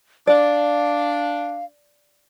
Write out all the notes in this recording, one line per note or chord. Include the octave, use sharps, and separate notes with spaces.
D4 D5 F5